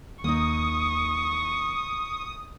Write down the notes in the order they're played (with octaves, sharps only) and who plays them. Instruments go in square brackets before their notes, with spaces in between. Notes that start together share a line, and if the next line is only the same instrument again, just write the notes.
[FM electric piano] D#2 [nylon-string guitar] A#3 D#4 [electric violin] C#6 [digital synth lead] D#6